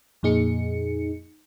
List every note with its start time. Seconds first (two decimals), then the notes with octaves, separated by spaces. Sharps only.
0.23 F2 A#2 D#4 G#4 C#7